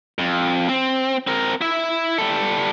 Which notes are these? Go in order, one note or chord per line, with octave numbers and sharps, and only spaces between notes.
F2
C4
C4 A#4
E4 E5
G3 A4